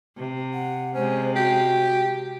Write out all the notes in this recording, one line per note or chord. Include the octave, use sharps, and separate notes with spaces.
C3
F#5
C3 G#3 C#4 C5
F#4 G4